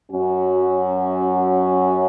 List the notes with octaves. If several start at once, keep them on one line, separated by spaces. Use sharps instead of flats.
F#2 F#3 C#4 F#4